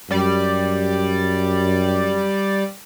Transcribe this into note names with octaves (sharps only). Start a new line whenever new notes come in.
F#2 G3 D5